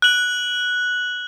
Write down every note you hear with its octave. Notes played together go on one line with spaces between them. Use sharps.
F#6 F#7